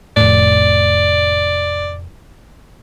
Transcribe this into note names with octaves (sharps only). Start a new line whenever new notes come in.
F1 A2 D5